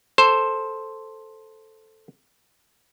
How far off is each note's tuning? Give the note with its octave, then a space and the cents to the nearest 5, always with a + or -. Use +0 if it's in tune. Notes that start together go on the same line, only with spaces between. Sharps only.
A4 +0 C5 +5